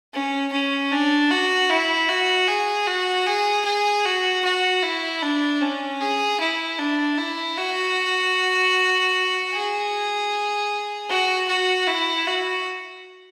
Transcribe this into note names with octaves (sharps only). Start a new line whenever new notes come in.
C#4
C#4
D4
F#4
E4
F#4
G#4
F#4
G#4
G#4
F#4
F#4
E4
D4
C#4
G#4
E4
D4
E4
F#4
G#4
F#4
F#4
E4
F#4